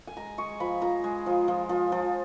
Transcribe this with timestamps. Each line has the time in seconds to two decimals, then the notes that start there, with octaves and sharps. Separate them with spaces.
0.07 G#5
0.16 G#3 A#5
0.38 G#3 C#6
0.60 F3 B5
0.81 F3 A#5
1.04 G#3
1.26 F3
1.48 F3
1.69 F3
1.92 F3